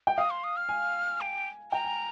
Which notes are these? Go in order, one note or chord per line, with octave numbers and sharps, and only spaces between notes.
G5
F5 D#6
C6
D#6
F6
G#5
G5
G5 A#5
G#5